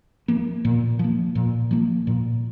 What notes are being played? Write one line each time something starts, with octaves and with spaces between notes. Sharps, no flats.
F3 A#3
A#2
F3 A#3
A#2
F3 A#3
A#2